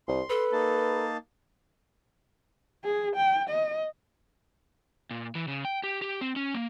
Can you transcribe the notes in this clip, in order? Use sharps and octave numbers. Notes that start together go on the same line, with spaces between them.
C2 C6
A4 B4
A#3 D#4 A5
G#4
G5
D#5
A#2
E3
C#3
G5
G4
G4
C4
C#4
A#3